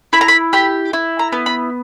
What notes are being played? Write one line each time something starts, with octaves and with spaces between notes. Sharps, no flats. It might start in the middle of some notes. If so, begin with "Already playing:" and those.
E4 B5
A#5
B5
G4 B5
E4
A#5
B3
B5